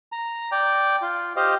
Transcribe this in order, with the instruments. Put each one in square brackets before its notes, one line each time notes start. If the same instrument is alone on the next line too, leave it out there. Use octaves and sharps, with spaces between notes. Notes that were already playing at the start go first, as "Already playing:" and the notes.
[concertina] A#5
D5 G5 D6
F4
G4 C5 D#5 F5